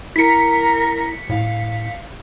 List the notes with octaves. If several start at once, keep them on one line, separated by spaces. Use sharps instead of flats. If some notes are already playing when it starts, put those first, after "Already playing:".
E4 A#4 B6 C#7
A2 F5